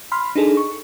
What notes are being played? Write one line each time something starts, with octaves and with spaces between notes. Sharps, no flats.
B5 C6 F6
D4 D#4 G#4 A4
C#6